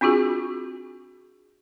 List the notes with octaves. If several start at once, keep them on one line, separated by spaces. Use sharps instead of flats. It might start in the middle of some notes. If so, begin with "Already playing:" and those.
C4 D4 F4 F#4 G#4